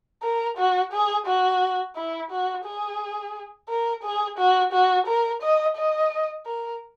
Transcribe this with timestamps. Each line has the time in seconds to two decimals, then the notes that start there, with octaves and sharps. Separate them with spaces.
0.22 A#4
0.57 F#4
0.92 G#4
1.26 F#4
1.96 E4
2.31 F#4
2.65 G#4
3.69 A#4
4.03 G#4
4.38 F#4
4.72 F#4
5.07 A#4
5.42 D#5
5.76 D#5
6.46 A#4